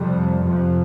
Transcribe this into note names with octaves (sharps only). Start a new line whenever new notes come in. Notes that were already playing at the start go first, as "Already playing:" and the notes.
Already playing: F2 C3 G3
F2 C3 F3